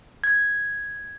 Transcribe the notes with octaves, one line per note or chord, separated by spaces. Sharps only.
G#6